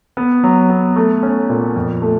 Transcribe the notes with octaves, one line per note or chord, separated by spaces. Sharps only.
B3
F#3
B3
A3
C#4
A#2
F2
A3